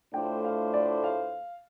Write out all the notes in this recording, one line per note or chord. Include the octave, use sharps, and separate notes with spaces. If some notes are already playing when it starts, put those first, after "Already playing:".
A2 A3 D4 F4 C5 G5
F5
D5
F5